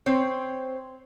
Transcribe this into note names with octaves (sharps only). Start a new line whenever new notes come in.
C4 C5 C#5